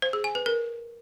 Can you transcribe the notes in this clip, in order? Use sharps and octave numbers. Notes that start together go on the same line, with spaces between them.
C5
G#4
G#5
B4
A#4